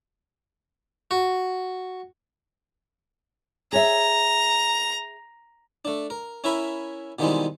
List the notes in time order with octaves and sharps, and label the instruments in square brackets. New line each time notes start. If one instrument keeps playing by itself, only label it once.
[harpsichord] F#4
[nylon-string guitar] G#4 C#5 E5 [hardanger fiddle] A#5
[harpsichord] A3 D4
A#4
C#4 E4 A#4 E5 G#5 B5
B2 D#3 E3 G3 G#3 C4